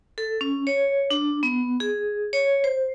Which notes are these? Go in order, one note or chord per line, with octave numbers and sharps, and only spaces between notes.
A4
C#4
C#5
D4
B3
G#4
C#5
C5